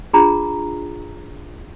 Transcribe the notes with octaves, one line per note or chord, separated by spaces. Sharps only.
D4 F4 G#4 A#5